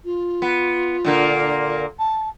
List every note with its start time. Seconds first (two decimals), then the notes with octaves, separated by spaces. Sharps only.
0.05 F4
0.42 B3
1.05 A#2 D3 A#3
1.99 A5